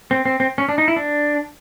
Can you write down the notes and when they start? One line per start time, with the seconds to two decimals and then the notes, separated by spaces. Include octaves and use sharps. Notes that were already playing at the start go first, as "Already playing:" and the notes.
0.11 C4
0.25 C4
0.40 C4
0.58 C#4
0.69 D4
0.78 D#4
0.88 E4
0.96 D4